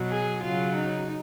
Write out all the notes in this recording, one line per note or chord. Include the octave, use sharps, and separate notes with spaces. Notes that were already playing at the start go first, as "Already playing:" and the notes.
Already playing: B2 F#3
G#4
C#3 F#3 F4
D#4